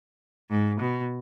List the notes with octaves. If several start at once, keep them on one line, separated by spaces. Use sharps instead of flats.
G#2
B2